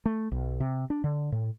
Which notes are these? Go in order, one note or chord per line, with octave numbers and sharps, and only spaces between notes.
A3
B1
C3
D4
D3
A2